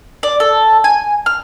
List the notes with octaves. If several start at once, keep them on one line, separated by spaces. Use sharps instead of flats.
D5
A4
G#5
F6